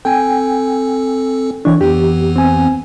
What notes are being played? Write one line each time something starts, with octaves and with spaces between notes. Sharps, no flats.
C4 A4 G5 G#5
E3 D4 C#5 C#6
F2 E3 B3 G4
C4 G#5